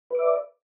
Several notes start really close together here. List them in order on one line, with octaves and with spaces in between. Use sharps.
B4 D6 E5 D5